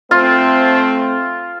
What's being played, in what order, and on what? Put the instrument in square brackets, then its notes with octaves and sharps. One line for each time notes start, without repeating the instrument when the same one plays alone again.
[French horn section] A3 C4 [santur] F4